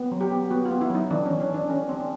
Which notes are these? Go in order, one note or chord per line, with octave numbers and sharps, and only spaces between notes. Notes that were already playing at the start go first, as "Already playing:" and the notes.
Already playing: B3
F#3
G4
B3
B3 F#4
F4
B3
E4
F#3 D#4
E3 D4
E3 C#4
C#4
E3 D4
E3 C#4
C4
D4